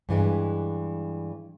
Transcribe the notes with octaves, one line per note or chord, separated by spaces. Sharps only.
G2 E3 G#3